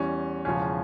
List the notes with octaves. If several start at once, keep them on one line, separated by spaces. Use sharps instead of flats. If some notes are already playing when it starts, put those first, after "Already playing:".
Already playing: E2 E3 G3 C#4
E1 E2 C#3 F3 C#4